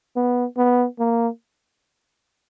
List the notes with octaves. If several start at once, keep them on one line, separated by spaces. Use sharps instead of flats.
B3
B3
A#3